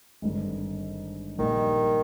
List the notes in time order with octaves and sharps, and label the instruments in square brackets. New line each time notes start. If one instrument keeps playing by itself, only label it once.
[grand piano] G#1 G2 D3
[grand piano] A#1 A#2 G3 [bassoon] D#3